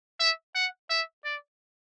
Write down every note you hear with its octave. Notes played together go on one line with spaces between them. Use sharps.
E5
F#5
E5
D5